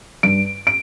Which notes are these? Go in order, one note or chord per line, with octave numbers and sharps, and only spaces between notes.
G2 D7
D7